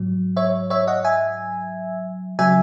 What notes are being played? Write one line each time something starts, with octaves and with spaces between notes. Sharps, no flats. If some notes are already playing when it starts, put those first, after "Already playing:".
Already playing: G#2 F#3
C#5 E5
C#5 E5
D#5 F#5
E5 G#5
C#3 F#3 E5 G#5